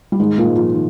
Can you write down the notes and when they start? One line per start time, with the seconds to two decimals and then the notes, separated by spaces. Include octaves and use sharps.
0.12 G3
0.19 G#2 D#3 G#3
0.38 A#2 A#3
0.47 G#2
0.56 F3 F4
0.75 D#3